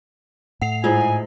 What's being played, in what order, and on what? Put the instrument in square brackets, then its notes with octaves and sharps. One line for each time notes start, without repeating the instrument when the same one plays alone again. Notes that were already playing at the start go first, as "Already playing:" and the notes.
[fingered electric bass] A2 [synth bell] F#5 C7 F7
[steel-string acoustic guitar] G#2 G#3 [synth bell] E4 F4 [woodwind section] G#5